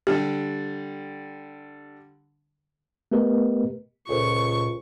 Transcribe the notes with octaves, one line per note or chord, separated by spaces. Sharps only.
D3 G3 G4
A3 B3 G4 A#4 B4 D#5
C#2 A#2 A4 A#4 C5 C#6